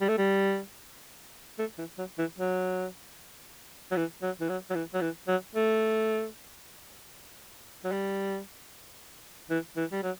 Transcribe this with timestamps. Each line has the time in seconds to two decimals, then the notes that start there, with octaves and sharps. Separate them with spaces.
0.01 G3
0.09 A3
0.18 G3
1.59 A3
1.78 E3
1.98 F#3
2.18 E3
2.39 F#3
3.91 F#3
3.97 E3
4.22 F#3
4.41 E3
4.49 F#3
4.70 F#3
4.75 E3
4.94 F#3
5.01 E3
5.28 F#3
5.55 A3
7.84 F#3
7.92 G3
9.50 E3
9.76 E3
9.92 G3
10.03 F#3